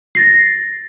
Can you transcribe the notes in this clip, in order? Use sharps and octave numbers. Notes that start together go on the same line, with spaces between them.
A6 A#6 C7